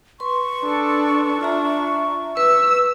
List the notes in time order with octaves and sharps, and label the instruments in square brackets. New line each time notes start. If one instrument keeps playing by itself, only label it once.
[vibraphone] B4 C6 [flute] C#6
[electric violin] D4 A4
[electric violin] D4 [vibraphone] F4 E5 A#5
[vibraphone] B4 [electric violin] E6